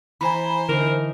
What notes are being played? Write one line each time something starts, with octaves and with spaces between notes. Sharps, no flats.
E3 C5 G#5 A#5 B5
D3 E3 D#4 A#4